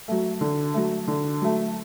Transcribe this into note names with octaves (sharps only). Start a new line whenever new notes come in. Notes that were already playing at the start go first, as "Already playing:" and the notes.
F#3 A3
D3
F#3 A3
D3
F#3 A3